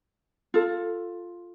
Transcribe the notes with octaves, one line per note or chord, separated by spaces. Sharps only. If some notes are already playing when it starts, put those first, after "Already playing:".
F4 A4